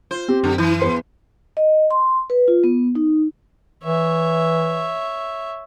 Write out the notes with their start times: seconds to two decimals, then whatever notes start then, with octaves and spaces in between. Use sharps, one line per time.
0.11 F4 C5
0.28 C4 G4
0.44 F#2 D3
0.58 E3 E4 G6
0.80 E2 B4 C6 C7
1.57 D#5
1.91 C6
2.30 B4
2.48 F4
2.64 B3
2.95 D#4
3.84 E3 C#5 E5